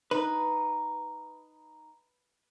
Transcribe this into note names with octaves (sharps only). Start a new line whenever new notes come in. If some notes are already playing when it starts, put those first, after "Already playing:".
D#4 B4